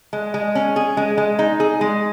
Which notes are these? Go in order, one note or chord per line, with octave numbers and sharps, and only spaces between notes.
G#3
G#3
C#4
G#4
G#3
G#3
D#4
G#4
G#3